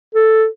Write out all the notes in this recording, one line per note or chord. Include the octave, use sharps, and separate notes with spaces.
A4